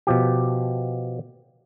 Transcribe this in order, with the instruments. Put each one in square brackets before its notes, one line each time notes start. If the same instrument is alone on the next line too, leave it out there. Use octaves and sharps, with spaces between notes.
[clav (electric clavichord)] B2 F3 G4